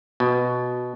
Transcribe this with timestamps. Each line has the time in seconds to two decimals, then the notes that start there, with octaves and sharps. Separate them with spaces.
0.20 B2